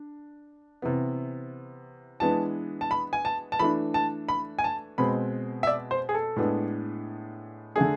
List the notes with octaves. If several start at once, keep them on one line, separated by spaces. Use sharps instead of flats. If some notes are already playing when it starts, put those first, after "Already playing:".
Already playing: D4
C3 E3 B3
E3 G#3 B3 D4 A5
A5
B5
G#5
A5
A5
E3 A3 D4 B5
A5
B5
G#5
A5
B2 G#3 C4 B5
E5
D5
C5
G#4
A4
A2 G#3 B3 D4
D3 A3 D4 G#4